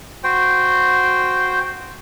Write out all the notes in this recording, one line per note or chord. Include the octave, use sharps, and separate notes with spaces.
F#4 C5 G5